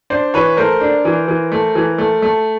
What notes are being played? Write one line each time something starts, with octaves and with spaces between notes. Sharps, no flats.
D4 C5 D5
E3 B4 C#5
A3 A#4 C5
D4
E3
E3
A3
E3
A3
A3